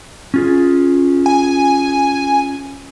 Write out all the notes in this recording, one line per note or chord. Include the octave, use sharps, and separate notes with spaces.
C#4 F4 G#4
G#5